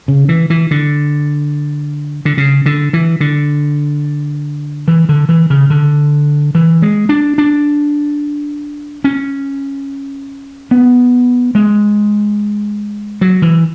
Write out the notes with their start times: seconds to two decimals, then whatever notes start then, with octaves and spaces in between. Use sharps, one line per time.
0.08 C#3
0.29 E3
0.50 E3
0.71 D3
2.25 D3
2.37 C#3
2.66 D3
2.93 E3
3.20 D3
4.88 E3
5.09 D3
5.29 E3
5.50 C#3
5.70 D3
6.55 E3
6.82 G#3
7.09 D4
7.38 D4
9.04 C#4
10.71 B3
11.55 G#3
13.21 F#3
13.42 E3